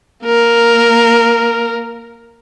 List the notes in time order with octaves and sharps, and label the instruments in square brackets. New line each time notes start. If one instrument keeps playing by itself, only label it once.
[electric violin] A#3 A#4